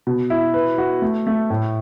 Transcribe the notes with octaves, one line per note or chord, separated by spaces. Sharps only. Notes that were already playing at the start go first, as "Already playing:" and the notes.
B2
E4
B4
F#4
A3
A3
A2